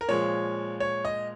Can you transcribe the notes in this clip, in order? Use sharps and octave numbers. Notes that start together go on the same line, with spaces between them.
A#4
A#2 F3 G#3 C#5
C#5
D#5